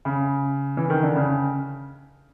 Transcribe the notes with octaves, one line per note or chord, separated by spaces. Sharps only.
C#3
E3
D#3
D3
C#3